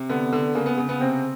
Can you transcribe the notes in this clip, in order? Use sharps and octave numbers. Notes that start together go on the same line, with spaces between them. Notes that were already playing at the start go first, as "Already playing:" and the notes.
Already playing: C3
D3 B3
D3
C#3 A#3
B3
C#3
B3
C3 C4